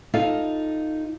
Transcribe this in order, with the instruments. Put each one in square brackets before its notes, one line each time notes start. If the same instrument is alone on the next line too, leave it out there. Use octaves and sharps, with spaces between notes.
[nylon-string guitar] D#4 F4 A4 F5